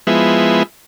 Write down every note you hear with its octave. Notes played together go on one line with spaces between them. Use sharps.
F3 G#3 B3 E4